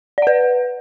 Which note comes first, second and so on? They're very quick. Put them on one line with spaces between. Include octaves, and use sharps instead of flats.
D5 F#5 B4